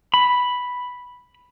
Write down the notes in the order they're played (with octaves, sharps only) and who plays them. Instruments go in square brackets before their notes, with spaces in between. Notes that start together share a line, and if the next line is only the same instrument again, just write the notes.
[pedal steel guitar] B5